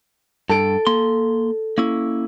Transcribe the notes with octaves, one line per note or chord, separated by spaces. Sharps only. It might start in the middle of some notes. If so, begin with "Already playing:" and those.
G2 A4 D7
A#3 C6
A#3 C#4 E4